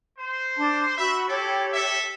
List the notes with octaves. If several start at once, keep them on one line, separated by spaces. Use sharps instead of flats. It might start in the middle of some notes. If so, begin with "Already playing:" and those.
C5
D4 A5
F#4 E5 B5
E4 G4 A4 C#5
A4 E5